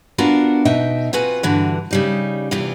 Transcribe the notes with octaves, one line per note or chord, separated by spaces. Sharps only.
B3 D4 F4 F#4 A#4
B2 D#4 D#5 E5 G5
C4 F4 F#4 B4 F#5 G#5
G2 D3 E3 F#4
C#3 G3 D#4
E2 C3 E3 E4 F4